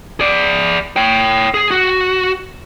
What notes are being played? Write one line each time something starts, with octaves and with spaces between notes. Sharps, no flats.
G#4 D5
C#5 G5
G#4
F#4